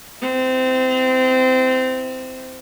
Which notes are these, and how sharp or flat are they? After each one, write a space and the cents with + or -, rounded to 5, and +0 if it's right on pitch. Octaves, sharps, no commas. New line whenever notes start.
C4 -20 E4 +5